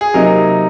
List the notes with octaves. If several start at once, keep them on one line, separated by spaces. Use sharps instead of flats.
G#4
C3 F#3 A#3 D#4 A#4